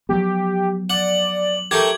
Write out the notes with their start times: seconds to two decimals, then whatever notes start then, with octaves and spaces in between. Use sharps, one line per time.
0.09 F3 F#3 B3 G4
0.90 D5 F#5 F#7
1.71 A3 A#3 G4 G5 G#6